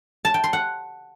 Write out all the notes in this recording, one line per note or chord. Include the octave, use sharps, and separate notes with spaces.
A5
G5
C6
F#5